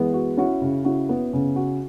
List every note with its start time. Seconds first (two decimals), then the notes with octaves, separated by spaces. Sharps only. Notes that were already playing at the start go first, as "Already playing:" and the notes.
Already playing: E3 G#3 B3
0.14 F#4
0.37 C#4 E4 F#4
0.61 C#3
0.85 C#4 E4 F#4
1.09 B3
1.33 C#3
1.56 F#4